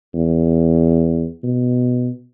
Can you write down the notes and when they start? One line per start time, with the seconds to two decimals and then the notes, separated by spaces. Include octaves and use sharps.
0.15 E2
1.44 B2